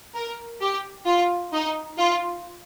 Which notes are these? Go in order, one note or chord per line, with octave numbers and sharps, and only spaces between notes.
A#4
G4
F4
D#4
F4